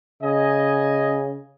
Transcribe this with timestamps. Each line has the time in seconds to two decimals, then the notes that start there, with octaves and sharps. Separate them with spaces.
0.23 C#3 D#5 G#5